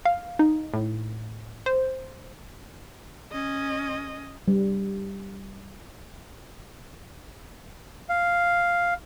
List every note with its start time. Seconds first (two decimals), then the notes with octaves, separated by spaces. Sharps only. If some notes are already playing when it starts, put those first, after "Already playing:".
0.05 F5
0.39 D#4
0.74 A2
1.66 C5
3.31 C#4 D#5
4.48 G3
8.09 F5